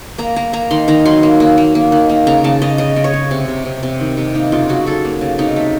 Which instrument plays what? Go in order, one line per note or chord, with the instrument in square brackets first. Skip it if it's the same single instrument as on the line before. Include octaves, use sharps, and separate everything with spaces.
[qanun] A#3 A#5
A#3 A#5
A#3 A#5
D#3 C6
D#3 A#5
F#3 C6
A#3
A#3
A#3
A#3
D#3
A#3
C#3 A#5
C#3 A5
C#3 D#5
C#3 D#5
C#3
C#5
C#3
C3
C3
C3
C3
D#3
C3
A#3 D#4
C#3 F4
F#3 F#4
F#3 A4
A#3
C#3
C3 D#4
A3